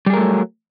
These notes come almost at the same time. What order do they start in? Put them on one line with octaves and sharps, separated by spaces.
G3 G#4 A#4 A3 F#3